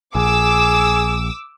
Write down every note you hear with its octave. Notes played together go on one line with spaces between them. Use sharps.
A#1 G#4 D6 E6